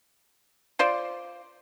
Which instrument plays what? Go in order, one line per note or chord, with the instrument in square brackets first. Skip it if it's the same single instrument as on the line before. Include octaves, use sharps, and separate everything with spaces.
[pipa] F4 C5 D5